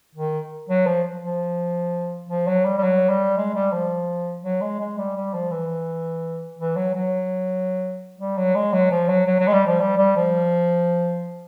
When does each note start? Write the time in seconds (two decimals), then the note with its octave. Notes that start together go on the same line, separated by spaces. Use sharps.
0.15 D#3
0.69 F#3
0.86 F3
1.22 F3
2.29 F3
2.47 F#3
2.65 G3
2.78 G3
2.83 F#3
3.09 G3
3.37 G#3
3.54 G3
3.73 F3
4.43 F#3
4.61 G#3
4.80 G#3
4.98 G3
5.16 G3
5.34 F3
5.51 E3
6.59 E3
6.76 F#3
6.95 F#3
8.19 G3
8.37 F#3
8.55 G#3
8.73 F#3
8.91 F3
9.09 F#3
9.27 F#3
9.40 F#3
9.48 G#3
9.53 G3
9.67 F3
9.80 G3
9.98 G3
10.16 F3